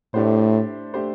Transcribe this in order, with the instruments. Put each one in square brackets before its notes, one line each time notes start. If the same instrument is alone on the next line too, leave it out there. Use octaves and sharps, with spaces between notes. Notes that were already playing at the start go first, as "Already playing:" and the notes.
[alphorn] A2 [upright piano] A3 D4 G4 C5
[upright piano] A3 D4 G4 C5